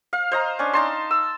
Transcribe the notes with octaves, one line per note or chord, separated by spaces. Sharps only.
F5
C5 D#5 A#5
C#4 D4
D#4 A5 C6
E6